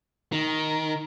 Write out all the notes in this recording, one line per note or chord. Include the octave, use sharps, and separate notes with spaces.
D#3